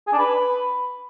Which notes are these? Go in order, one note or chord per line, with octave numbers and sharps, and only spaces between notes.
G#4
D4
B4